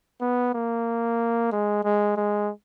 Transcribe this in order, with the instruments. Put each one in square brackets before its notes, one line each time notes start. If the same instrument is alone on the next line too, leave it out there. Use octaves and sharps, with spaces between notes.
[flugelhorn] B3
A#3
G#3
G#3
G#3